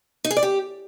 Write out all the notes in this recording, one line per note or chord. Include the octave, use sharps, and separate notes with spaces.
D#4
G#4
D5
G4